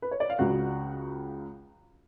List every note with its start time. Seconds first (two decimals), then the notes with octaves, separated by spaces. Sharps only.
0.02 B4
0.11 C#5
0.20 D5
0.30 F5
0.39 C#2 C#3 F#4 F#5